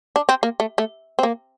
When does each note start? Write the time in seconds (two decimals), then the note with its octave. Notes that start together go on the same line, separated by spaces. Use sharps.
0.16 D4
0.29 C4
0.43 A#3
0.60 A3
0.78 A3
1.19 C4
1.23 A#3